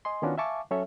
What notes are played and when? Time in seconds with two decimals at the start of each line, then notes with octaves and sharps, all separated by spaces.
0.05 D#5 G#5 C6
0.22 D#3 B3 C#4 D4 F4 F#4
0.38 E5 F5 G#5 A5 C#6 D6
0.71 F#3 C#4 A4 C#5 E5